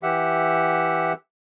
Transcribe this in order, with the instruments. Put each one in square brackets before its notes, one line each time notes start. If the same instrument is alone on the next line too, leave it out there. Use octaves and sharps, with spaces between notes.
[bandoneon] E3 G4 E5 F#5